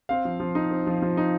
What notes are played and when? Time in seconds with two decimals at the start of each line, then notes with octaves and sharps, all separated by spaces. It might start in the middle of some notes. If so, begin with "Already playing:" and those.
0.09 C4 F5
0.25 F3
0.40 F3
0.55 D#4
0.71 C4
0.87 F3
1.02 F3
1.17 D#4